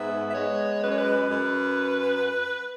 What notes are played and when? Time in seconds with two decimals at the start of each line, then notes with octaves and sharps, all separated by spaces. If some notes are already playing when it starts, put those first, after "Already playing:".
Already playing: G#2 B3 E5
0.30 E5
0.35 G#3 C#5
0.82 F#2 B4
0.90 C#5
0.98 B4
1.29 F#2